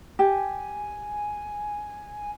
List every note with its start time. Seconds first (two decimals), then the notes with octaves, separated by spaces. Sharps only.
0.19 G4 G#5